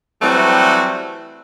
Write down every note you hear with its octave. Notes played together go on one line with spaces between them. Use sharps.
E3 F#3 G3 A3 C4 F#4